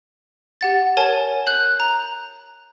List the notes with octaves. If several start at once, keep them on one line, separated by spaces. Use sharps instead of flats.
G4 F#5 A6
A#4 C#5 G#5 A5
F#6 G6 F#7
A#5